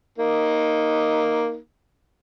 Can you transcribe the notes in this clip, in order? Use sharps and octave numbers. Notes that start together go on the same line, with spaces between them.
A#3 D#4